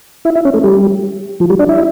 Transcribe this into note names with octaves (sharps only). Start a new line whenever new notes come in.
E4 E5
E4 E5
C#4 C#5
A3 A4
G3 G4
F3 F4
G3 G4
D4 D5
E4 E5